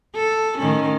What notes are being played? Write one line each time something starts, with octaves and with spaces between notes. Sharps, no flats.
A4
A2 D#3 C#4